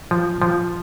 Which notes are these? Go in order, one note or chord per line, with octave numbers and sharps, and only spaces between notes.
F3
F3